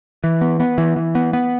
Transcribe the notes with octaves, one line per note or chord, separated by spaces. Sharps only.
E3
B3
B3
E3
E3
B3
B3